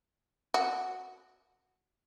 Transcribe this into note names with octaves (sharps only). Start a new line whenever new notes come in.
F#4